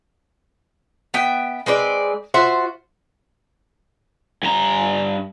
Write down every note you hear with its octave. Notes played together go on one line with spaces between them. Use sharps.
B3 E5 G5
G#3 C4 B4 D5
F4 F#4 C5 E5
G2 A#5